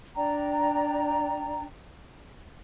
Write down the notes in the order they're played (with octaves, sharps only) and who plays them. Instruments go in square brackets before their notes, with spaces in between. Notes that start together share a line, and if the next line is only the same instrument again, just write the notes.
[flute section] D4 D5 G5 A#5